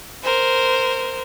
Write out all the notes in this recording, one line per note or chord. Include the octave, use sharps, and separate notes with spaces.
A#4 C5